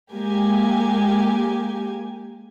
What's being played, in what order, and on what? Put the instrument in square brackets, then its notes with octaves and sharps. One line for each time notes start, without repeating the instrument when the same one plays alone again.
[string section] G#3 A#3 G4 G#5